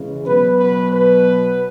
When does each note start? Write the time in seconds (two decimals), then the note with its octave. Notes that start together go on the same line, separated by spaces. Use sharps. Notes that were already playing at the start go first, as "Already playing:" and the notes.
Already playing: C#3 E3 G#3
0.26 B2 F#3 B3 B4
0.59 B4
0.92 B4